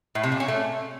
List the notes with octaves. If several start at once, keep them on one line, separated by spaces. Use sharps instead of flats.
A2
C3
A#2
C#4
A3